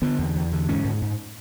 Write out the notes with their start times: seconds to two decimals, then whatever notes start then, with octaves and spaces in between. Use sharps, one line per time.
0.02 D3 B3
0.19 E2
0.36 E2
0.52 D3
0.69 G#2 C#4
0.84 G#2
1.02 G#2